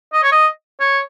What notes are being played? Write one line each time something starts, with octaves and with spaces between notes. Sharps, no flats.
D#5
C#5
D#5
C#5